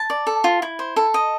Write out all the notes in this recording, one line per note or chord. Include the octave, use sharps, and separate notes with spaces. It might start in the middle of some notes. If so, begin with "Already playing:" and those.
Already playing: A5
D5
A4
F4
E4
C5
A4
D#5